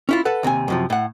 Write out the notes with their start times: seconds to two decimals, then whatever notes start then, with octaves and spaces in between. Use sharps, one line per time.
0.09 C#4 E4 F4
0.25 A4 B4 F#5
0.43 D#2 C3 C4 G#5
0.68 F#2 C3 F3
0.90 A2 F#5